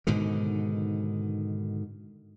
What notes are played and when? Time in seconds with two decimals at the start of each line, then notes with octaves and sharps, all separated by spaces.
0.07 G#2 B2 D3 D#3